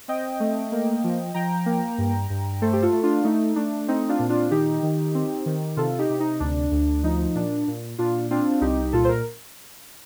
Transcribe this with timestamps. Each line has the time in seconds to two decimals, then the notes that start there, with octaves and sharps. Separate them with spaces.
0.08 C4 D#5 G5
0.40 A3
0.72 A#3
1.04 F3
1.34 F3 G5 A#5
1.66 A#3
1.98 G2
2.30 G2
2.62 A3 A4 C5
2.73 G4
2.82 F4 A4
2.93 A3
3.03 D4 F4
3.24 A3 D#4
3.56 A3 D4
3.88 C4 D#4
4.09 D4 F4
4.19 A#2
4.29 D4 F4
4.51 D#3 D#4 G4
4.83 D#3
5.15 C4
5.46 D#3
5.77 C3 F4 A4
5.99 D#4 G4
6.10 C3
6.20 D#4
6.40 D2 D4
6.72 D2
7.03 F3 D#4
7.35 A#2 D4
7.68 A#2
7.98 A#2 D4 F4
8.31 C4 D4 F4
8.61 C2 D#4 G4
8.93 A#2 F4 A4
9.04 C5
9.09 A#4